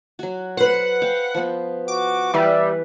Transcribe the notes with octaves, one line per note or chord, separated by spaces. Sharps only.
F#3 F#4
B4 C5 F#5
F5 G5
F3 B3
F#4 D6
E3 G3 B4 E5